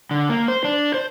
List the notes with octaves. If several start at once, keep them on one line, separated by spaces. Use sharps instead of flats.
D3
A#3
C5
D4
C5